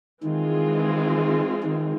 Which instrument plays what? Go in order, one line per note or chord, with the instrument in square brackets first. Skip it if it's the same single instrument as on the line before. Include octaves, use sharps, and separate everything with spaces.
[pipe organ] D#3 [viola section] E3 G#3 C4 F4 G#4
[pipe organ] D#3